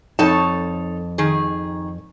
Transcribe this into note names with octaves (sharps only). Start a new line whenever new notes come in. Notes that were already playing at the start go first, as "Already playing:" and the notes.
F2 D#4 A4 C#5 A5
D#3 G#4